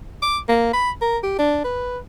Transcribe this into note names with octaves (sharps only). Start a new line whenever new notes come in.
D6
A#3
B5
A#4
G4
D4
B4